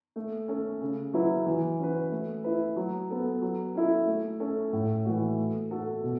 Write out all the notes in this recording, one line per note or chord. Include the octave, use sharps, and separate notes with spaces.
A3
C#4 A4
C#3
F#3 C#4 E4 B4
E3
C#4 F#4 B4
A3
E4 B4
F#3
B3 A4
F#3
C#4 E4 A4
A3
C#4 A4
A2
E3 A3 F#4
A3
F#4 A4
B2